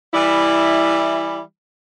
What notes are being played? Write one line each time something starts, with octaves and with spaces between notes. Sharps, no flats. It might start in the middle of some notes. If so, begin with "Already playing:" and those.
E3 G3 E4